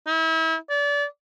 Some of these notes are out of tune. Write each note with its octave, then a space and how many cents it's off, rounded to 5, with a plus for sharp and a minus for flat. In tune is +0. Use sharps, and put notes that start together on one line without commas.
E4 -35
D5 -30